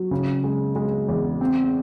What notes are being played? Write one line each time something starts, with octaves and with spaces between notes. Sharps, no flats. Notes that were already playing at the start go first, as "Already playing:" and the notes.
Already playing: F#3
C#3
G#3
G#3
E2
C4